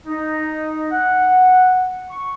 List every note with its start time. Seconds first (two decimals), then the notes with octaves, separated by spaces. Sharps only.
0.06 D#4
0.92 F#5
2.10 C#6